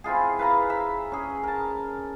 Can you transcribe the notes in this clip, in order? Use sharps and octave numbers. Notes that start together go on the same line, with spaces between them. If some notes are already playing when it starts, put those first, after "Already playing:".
C4 E4 F4 G#4
B4 F5 A#5
E5 A#5
C#4 G#4
A#4 A5